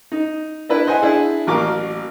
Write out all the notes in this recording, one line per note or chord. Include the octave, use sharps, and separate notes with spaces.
D#4
D4 E4 B4
C5 D#5 F#5 G#5
D4 E4 G#4
A1 F#3 A#3 A#4 F5 D6